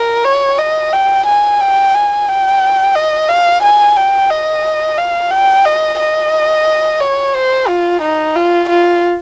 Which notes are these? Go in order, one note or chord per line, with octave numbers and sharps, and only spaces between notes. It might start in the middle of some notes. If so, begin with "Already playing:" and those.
Already playing: A#4
C#5
D#5
G5
G#5
G5
G#5
G5
D#5
F5
G#5
G5
D#5
F5
G5
D#5
D#5
C#5
C5
F4
D#4
F4
F4